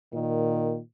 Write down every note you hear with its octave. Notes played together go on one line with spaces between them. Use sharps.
A#2 D#3